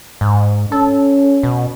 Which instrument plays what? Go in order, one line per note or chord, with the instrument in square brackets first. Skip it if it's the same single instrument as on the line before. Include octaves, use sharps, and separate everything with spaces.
[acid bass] G#2
[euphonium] C#4 [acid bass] A4
[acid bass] B2